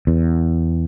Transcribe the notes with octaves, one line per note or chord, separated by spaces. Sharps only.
E2